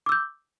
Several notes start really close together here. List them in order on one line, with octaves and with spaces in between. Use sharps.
D6 E6 G6